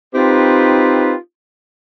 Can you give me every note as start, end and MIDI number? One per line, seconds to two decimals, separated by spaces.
0.15 1.13 60
0.15 1.13 63
0.15 1.13 65
0.15 1.13 67
0.15 1.13 71